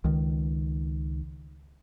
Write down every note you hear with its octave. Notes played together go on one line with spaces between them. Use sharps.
C#2 D#3